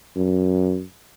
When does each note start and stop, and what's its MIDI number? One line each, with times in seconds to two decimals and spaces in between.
0.16 0.83 42